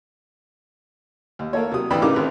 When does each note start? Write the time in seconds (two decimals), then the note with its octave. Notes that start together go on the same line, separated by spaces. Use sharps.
1.39 D#2
1.53 A#3 A4 C#5
1.72 C3 F#3 D#6
1.91 A1 F2 E3 D4 G5 B5
2.02 C#3 E3 D#4 G4 A#4 D6
2.14 G#1 B4